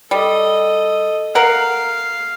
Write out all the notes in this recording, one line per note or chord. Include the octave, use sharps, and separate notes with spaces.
G3 A4 D#5
A#4 F5 F#5